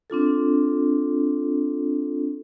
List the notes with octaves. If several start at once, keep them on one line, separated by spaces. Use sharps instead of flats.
C4 D4 F4 A4